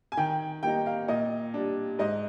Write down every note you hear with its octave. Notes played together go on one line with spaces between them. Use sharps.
G#5
D#3 G5
G3 A#3 D#4 G5
F5
A#2 D#5
G3 D4
G#2 D#5